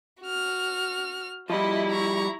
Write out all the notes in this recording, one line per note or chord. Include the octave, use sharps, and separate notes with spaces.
F#4 F6
F3 G3 E4 D#5
A#5 C#6